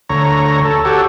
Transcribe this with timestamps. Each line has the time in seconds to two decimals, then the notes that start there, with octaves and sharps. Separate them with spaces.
0.09 D2 C#5 A#5
0.65 A4
0.85 F#4 G4 A4 C#5